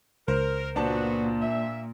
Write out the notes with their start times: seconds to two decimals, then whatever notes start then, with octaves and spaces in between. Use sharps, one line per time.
0.28 C#2 A#4 C5
0.76 A#2 B3 D4 F#4 C5 A5
1.42 E5